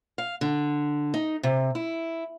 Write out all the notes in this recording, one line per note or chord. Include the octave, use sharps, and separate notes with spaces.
F5
D3
D#4
C3
E4